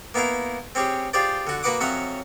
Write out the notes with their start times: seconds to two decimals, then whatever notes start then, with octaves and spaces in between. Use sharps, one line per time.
0.14 A#3 B3 E4 A#4 F5
0.75 C4 C#4 G4 G#4
1.13 F4 G4 G#4 C5 D5
1.47 D3 F#4
1.63 A#3 F#4 B4 F#5 D6 D#6
1.80 F2 F#3 C#4 E5 F#5 D#6